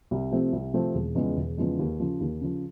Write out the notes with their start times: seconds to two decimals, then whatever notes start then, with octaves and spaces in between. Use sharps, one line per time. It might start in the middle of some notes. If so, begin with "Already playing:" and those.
0.11 C2
0.32 C3 F3 A3 C4
0.53 C2
0.74 C3 F3 A3 C4
0.95 E1
1.15 E2 C#3 F3 G#3
1.37 E1
1.57 E2 C#3 F3 G#3
1.79 D#2
2.00 C#3 F3
2.20 D#2
2.41 C#3 F3